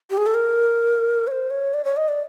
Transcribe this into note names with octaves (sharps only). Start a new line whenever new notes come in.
G4
G#4
A4
A#4
C#5
C5
C#5
D5
C#5
D#5
D5